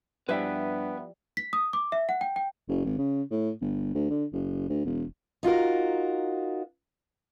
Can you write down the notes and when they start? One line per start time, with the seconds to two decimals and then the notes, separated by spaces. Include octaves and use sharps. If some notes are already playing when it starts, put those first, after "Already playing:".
0.29 G2 F3 G3 B3 E4 B4 E5 G5
1.37 B6
1.53 D#6
1.73 D6
1.92 E5
2.09 F#5
2.21 G5
2.36 G5
2.69 F#1
2.85 G#1
2.98 C#3
3.31 A2
3.61 G1
3.94 D2
4.10 D3
4.33 F#1
4.69 D2
4.85 E1
5.43 D#4 F4 F#4 A#4